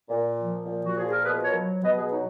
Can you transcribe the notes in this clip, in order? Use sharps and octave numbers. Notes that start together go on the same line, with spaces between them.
A#2
F3
A#2
F#4
F3 G#4
A#4
B2 G#4 B4
A#4 C#5
F#3
B2 B4 D#5
G#4 B4
F#3 D#4